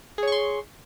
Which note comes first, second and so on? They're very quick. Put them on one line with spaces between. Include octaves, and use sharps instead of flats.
G#4 C#5 C#6 C6